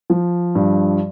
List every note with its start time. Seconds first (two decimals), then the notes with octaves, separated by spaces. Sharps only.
0.10 F3
0.55 G2